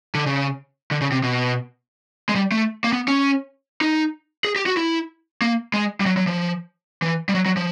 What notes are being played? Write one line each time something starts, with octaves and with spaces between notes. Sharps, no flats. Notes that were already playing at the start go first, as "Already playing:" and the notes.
D3
C#3
D3
C#3
C3
B2
G#3
G3
A3
A#3
B3
C#4
D#4
G#4
G4
F#4
E4
A#3
G#3
G3
F#3
F#3
F3
E3
G3
F#3
F#3
F3